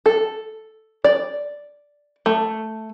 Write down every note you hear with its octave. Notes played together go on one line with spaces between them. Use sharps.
A4
D5
A3